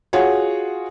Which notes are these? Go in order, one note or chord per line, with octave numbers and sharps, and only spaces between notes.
F4 F#4 G#4 C#5 F#5